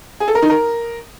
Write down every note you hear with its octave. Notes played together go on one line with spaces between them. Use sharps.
G#4
A4
A#4
D#4
A#4